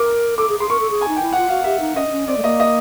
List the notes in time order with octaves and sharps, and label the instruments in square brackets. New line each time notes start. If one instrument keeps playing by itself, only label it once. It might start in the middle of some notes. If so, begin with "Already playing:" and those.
Already playing: [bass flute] A#4 [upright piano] D6
[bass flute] A4 [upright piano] D6
[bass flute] G#4
[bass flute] G#4 [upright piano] C6
[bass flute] A#4 [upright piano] C#6
[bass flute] A4
G#4
[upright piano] G#5
[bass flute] D#4
[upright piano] G5
[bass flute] E4
[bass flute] F4 [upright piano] F#5
[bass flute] F#4 [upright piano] F5
[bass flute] G4 [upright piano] E5
[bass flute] D#4
[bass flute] C#4 [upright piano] D#5
[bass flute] D4
C#4
[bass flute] C4 [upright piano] D5
[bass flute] A3
[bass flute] A#3 [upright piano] D#5
[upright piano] D#5